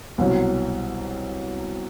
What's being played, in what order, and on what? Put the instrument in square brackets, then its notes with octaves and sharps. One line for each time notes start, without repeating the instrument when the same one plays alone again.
[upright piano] C2 B2 F#3